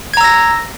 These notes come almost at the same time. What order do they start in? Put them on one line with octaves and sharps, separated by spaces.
G#6 A#5 E6 A#6